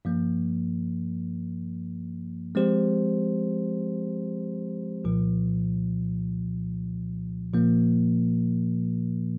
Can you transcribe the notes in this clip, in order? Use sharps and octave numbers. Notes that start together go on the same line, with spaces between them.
G2 F3 A#3
F3 G#3 C4 G4 C5
C2 A#2 F3
A#2 F3 A#3